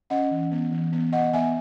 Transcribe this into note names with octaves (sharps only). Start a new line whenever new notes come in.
C#4 D#5 F#5
E3
B3
E3
B3
B3 D#5 F#5
B3 E5 G#5